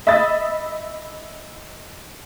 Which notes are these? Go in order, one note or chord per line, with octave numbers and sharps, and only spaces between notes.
D#5 E5 B5 D#6 A6